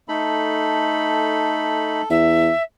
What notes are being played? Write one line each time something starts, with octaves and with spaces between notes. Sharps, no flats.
A3 D#4 A4 B5
E2 E5